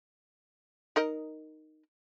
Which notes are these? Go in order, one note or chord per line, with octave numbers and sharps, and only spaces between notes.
D#4 A#4 D#5